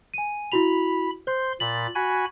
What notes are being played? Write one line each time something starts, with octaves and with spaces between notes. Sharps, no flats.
G#5 D#7
E4 F#4 B5 F7
C5 C6 G6
A#2 B5 A6 F#7
F#4 G#5 B5